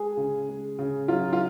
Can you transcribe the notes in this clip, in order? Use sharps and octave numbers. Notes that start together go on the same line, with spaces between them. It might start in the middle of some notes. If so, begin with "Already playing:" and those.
Already playing: G#3 G#4
C#3
G#3
C#3
F#3 F4
F4